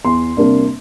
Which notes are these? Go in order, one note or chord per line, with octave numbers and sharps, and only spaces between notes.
E2 C6
C3 G3 A#3 D4